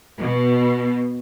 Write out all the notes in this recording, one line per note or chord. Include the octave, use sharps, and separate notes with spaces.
B2